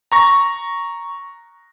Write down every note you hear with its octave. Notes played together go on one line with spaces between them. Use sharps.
A#5 C#6 A#6